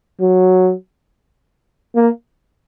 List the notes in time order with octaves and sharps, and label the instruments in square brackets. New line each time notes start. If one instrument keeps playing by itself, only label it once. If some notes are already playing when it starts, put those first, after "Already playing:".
[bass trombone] F#3
A#3